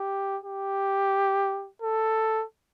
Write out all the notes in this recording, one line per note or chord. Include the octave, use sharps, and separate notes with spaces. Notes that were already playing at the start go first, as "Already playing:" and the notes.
Already playing: G4
G4
A4